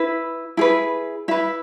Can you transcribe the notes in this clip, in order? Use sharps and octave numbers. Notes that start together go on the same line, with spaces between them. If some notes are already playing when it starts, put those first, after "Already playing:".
Already playing: E4 B4
E4 G#4 B4
E4 B4 E5